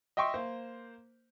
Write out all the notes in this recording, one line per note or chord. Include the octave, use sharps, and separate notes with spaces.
D#5 E5 G5 C6 C#6
A#3 C5